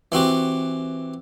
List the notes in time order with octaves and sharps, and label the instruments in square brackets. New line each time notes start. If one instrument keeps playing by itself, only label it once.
[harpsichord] E3 C4 F#4 G4